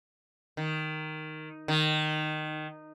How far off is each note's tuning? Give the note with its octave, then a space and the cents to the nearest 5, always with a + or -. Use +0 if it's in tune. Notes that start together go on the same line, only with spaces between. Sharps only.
D#3 +0
D#3 -15